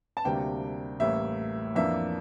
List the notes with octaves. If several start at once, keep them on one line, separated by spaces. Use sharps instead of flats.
A5
D2 C3 G3 A#3 D4 G5
A1 A2 G3 A#3 E5
F2 E3 A#3 D4 E5